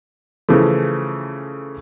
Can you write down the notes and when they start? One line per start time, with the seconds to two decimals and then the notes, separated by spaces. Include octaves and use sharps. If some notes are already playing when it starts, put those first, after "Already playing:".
0.49 C#3 E3 F3 A3